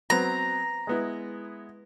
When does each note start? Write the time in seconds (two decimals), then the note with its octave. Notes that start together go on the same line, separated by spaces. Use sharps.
0.10 F#3 B3 C4 A#5
0.87 G#3 B3 E4